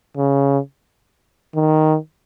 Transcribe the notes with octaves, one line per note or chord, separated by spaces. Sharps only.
C#3
D#3